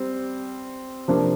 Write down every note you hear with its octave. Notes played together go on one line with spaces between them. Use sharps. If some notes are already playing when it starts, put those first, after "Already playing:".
Already playing: G3 C4
C3 F3 A#3 D4